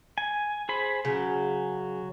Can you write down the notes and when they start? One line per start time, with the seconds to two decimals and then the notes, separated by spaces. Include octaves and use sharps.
0.18 G#5
0.69 G#4 C5 B5
1.05 C#3 F#3